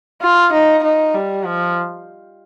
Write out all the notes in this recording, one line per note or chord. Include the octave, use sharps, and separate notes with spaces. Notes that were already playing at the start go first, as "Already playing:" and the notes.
F4
D#4
D#4
G3
F3